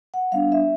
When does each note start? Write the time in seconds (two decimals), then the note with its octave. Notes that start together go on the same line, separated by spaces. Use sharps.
0.14 F#5
0.32 G3 B3 D4 F5
0.52 E5